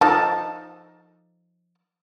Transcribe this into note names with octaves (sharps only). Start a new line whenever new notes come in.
F3 D#4 A4 A5